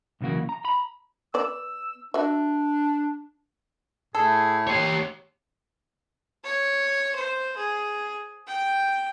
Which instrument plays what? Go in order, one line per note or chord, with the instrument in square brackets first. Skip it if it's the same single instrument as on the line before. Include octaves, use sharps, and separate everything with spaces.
[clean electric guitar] B1 C#3 E3 A#3 F#4
A#5
A#5 B5
[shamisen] B3 D5 [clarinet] E6
[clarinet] D4 [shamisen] F#4 E5
[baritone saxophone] A2 [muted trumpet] G#4 [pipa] A4
[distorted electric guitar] G4 C#5 [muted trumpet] C6
[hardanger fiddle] C#5
C5
G#4
G5